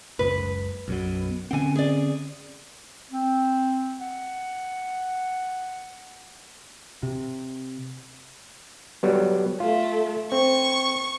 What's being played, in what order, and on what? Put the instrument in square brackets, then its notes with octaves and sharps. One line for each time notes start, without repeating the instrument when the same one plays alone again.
[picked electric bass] F#1 C#2 [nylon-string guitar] B4
[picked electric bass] B1 F#2 B2 [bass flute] B3
[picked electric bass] D3 C4 [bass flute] C#4 [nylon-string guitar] F#5 G#5
[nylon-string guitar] G#4 D5
[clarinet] C4
F#5
[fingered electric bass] C3
[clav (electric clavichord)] F#3 G3 B3
[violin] A3 [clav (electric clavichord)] F4
[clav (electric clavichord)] C4 [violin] C#6